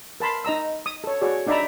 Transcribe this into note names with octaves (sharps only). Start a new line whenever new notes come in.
A#4 A5 B5 C6
D#4 D#5 A#5 E6
D#6
A4 C#5
F#4 G#4 C#5 D5
D4 D#4 D5 E5 A#5 B5